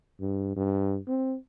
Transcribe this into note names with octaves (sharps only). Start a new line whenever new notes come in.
G2
G2
C4